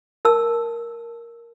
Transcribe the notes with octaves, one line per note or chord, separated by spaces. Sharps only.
A#4 A5 E6